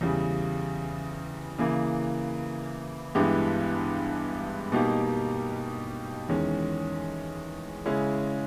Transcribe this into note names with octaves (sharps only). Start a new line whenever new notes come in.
E2 C#3 G3
C#3 E3 A#3
G2 E3 G#3 B3 G4
B2 G3 A#3 D#4 G4
E2 D#3 G#3 C#4
C#3 G#3 C#4 E4